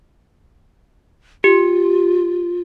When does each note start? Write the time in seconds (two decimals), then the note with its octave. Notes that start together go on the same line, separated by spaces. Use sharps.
1.44 F4 G4